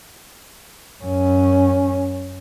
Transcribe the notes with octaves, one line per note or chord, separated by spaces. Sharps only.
F#2 C#4